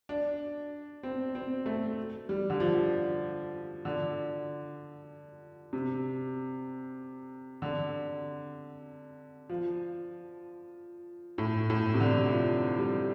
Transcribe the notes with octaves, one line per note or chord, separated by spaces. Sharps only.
D4
C4
C4
A3
G3
D3
F3
D3
C3
D3
F3
A2
A2
C3
D3
F3
G3